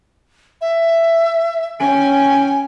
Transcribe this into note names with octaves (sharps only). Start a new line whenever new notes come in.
E5
C#4 G5 G#5